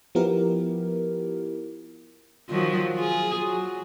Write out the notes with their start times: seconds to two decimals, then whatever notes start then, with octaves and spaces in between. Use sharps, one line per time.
0.15 F3 B3 E4 G4 A#4
2.50 D#3 F3 F#3
2.95 F4 G#4
3.41 F#3